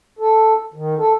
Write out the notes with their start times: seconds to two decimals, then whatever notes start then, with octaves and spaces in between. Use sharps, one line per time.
0.19 A4
0.74 D#3
0.98 A4